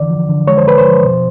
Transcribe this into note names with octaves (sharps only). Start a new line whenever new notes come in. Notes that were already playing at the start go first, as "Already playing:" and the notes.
Already playing: D3 E3 D5
F3
D3
G#3 C#5
C5
D3 B4
C5
F3
B2